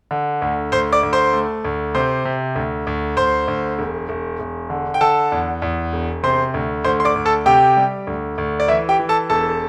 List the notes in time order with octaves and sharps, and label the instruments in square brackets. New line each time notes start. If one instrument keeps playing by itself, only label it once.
[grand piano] D3
D2
D2 C5 C6
D5 D6
D2
C5 C6
A3
D2
C3 C5 C6
C3
D2
D2
D2 C5 C6
D2
E1
E1
E1
D3
G5
D3 A4 A5
E2
E2
E1
C3 C5 C6
D2
D2 C5 C6
C6
D5 D6
D2
A4 A5
C3 G4 G5
G3
D2
D2
D5
E3 E4 E5
G4 G5
E3
A4 A5
E1 A4 A5